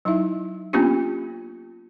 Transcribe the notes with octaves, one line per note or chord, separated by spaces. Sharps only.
F#3 D#4 E4 E5
A#3 B3 C#4 D4 F4 G4